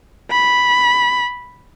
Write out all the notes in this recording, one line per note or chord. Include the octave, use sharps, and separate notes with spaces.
B5